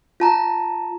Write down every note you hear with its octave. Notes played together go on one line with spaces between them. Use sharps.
F4 A5 A#5